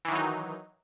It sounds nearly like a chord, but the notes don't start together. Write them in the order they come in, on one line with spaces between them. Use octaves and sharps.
E3 D#3 F#3 D#4